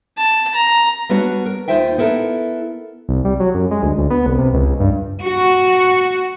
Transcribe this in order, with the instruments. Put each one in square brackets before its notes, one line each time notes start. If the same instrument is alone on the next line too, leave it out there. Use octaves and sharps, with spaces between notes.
[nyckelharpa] A5
A#5
[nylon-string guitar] G3 B3 D4 F#4 C#5 F#5
A#4
D#2 D#4 F4 C5 E5 G5
B3 E4 A4 A#4
[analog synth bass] C2
G3
F#3
F#2
G#3
D2
D2
B3
C2
C3
C#2
G2
[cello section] F#4